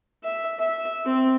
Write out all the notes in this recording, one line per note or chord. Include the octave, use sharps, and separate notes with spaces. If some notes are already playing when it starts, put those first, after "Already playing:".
E5
E5
C4